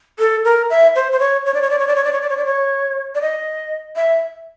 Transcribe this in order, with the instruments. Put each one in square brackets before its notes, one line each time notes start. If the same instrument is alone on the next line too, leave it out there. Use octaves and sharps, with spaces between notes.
[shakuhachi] A4
A#4
E5
C5
C5
C#5
C#5
D5
C#5
D5
C#5
D5
C#5
D5
C#5
D5
C#5
D5
C#5
D5
D#5
E5